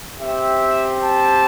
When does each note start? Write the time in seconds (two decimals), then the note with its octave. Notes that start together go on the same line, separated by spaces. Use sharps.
0.20 C4 G4 E5
1.02 A5